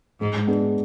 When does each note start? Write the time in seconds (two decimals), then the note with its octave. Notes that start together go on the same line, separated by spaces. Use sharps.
0.20 G#2 G#3
0.47 B3 D4 G#4